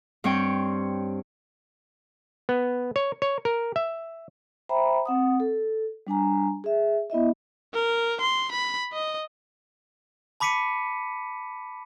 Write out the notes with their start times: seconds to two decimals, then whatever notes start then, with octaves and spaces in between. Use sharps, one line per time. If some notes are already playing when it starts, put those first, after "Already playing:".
0.24 G2 C4 C#5 G5
2.49 B3
2.96 C#5
3.22 C#5
3.45 A#4
3.76 E5
4.69 C5 E5 G5 A#5 B5
5.06 C4 F#5 D#6
5.40 A4
6.07 G3 D4 G#5 A#5
6.64 G#4 E5
7.10 B3 E4 D#5 E5
7.74 A#4
8.20 C6
8.51 B5
8.93 D#5
10.40 A5 B5 D6 B6 C#7 D#7